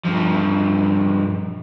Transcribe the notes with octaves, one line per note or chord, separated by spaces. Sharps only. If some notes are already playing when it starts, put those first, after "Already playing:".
G2 F3